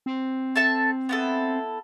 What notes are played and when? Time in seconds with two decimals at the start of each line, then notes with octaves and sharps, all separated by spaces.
0.06 C4
0.56 A4 E5 A5
1.09 B3 E4 A4